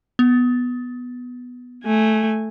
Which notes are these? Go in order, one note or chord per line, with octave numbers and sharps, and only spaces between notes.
B3
A3 G#5